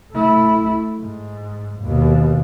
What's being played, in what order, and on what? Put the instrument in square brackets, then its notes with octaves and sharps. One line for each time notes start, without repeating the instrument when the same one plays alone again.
[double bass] A3 E4
G#2
D#2 B2